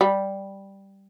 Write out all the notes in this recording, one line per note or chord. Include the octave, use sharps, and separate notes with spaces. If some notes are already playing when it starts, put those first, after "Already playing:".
G3